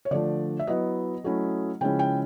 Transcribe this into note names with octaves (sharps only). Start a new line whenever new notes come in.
C#5
D3 F3 A3 D4 D5
E5
F#3 B3 E4 D#5
F#3 A3 C#4 E4
C#3 F3 G#3 C#4 E4 G5
G5